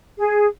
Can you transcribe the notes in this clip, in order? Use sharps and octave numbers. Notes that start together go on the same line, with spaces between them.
G#4